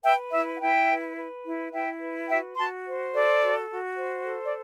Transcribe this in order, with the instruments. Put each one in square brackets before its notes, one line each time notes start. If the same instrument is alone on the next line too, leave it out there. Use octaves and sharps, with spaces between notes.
[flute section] B4 E5 G5
E4 E5
F#5
E4 E5 G5
B4
B4
E4
E4 E5 G5
B4
F#4 E5 G5
F#4 A5 C6
C5
A4 D5
F#4
F#4
C5
A4
D5